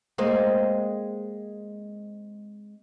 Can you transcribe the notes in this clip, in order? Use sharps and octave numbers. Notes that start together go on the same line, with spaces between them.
G#3 A#3 C4